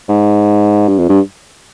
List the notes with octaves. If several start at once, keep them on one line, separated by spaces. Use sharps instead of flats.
G#2
G2
F2
G2